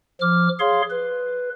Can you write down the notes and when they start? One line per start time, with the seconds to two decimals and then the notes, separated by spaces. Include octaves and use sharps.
0.21 F3 D6 F6
0.60 G#4 C#5 F5 C6
0.90 B4